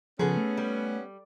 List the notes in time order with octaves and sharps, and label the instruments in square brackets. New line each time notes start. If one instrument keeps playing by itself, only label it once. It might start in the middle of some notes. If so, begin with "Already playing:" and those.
[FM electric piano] C#3 F3 [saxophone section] B3 C#4 [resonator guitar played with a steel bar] G#4 A4
[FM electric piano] A3
[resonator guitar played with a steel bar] G3